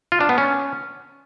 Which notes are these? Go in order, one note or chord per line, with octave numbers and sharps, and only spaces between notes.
F4
D4
B3
C#4